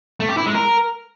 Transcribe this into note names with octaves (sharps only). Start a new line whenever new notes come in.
A3
G4
E4
G#3
A#4